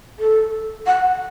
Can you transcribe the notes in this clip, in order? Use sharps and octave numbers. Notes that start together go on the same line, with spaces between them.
A4
F#5